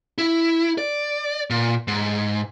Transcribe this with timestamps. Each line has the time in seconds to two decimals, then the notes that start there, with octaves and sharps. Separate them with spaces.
0.18 E4
0.78 D5
1.50 A#2
1.88 G#2